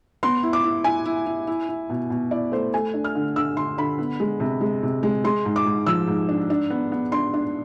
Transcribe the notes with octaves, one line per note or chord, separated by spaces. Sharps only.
B3 C6
E4
D6
E4
E4 G#5
E4
E4
E4
E4
B2
B2
E4 D5
A3 C5
A3 G#5
D4
F6
D3
D3 E6
D3 C6
D3 B5
B3
G#3
C3
G#3
C3
G#3
G#3 C6
G#2
D6
G#2
F3 E6
G#2
D4
D4
B3
B3
D4 C6
D4